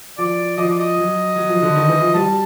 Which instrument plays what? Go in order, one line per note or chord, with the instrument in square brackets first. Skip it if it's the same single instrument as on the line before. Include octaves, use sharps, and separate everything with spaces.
[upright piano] F3 [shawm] D5
[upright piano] F3 [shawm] D#5
[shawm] D5
D#5
[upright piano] F#3
F#3
F3
D3
D#3
E3
F3
[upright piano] G3 [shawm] A5